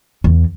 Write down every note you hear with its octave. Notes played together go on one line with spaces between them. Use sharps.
E2